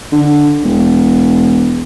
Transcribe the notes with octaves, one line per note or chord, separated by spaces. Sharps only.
D3
E1